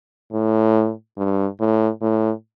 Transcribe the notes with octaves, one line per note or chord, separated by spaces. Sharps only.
A2
G2
A2
A2